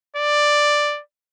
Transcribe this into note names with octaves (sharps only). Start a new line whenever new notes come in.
D5